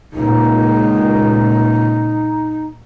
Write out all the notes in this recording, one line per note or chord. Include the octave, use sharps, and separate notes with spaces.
C#2 A#2 D#4